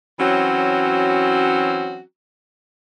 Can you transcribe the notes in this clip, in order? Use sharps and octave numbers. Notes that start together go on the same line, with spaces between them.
E3 F#3 C4 C#4 F#4